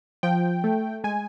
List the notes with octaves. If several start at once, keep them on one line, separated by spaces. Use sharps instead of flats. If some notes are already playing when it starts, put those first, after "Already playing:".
F3 G5
A3
G#3 G#5